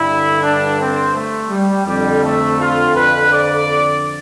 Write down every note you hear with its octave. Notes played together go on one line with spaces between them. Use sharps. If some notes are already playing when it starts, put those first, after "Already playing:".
Already playing: G2 D3 E4
D4
C4
A3
G3
F2 D3 G3
A3
F4
B4
D5